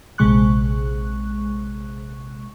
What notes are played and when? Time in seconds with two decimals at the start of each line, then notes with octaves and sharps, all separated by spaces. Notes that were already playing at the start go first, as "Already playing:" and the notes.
0.18 A#1 C3 G#3 C#6 F#6